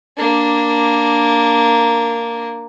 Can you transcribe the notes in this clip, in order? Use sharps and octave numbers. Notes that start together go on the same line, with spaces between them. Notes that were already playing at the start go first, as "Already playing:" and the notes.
A#3 D4